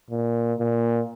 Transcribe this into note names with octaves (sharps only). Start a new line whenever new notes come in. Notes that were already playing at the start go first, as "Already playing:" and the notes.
A#2
A#2